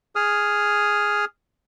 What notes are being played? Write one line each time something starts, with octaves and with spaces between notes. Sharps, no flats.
G#4 D#6 F6